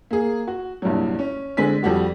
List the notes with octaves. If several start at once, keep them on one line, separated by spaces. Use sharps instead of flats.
A#3 G#4
F#4
C2 G2 A#2 F#3
C#4
D3 G#3 C4 G#5 B6
F2 G3 F#4 G4